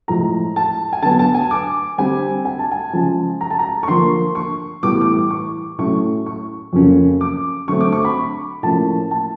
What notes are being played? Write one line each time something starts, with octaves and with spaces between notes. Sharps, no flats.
A2 F3 G#3 A#5
A5
G#5
D3 F#3 B3 A5
A5
G#5
D6
D3 G3 C4 G#5
G#5
A5
G#5
C#3 F3 G#3 A5
A#5
A5
A#5
C#6
D3 F3 A#3 C6
C#6
A2 E3 G3 B3 D6
D6
C#6
A2 F#3 A3 C#4 C#6
C#6
F2 C#3 F#3 A#3 C#4
D6
D3 F#3 A3 C4 C#6
D6
C#6
B5
A2 F3 A#3 C#4 A5
A5